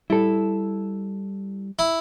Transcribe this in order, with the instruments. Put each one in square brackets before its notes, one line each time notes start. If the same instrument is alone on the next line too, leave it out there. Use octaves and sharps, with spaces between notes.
[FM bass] G3 [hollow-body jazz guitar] E4 A4
[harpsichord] E4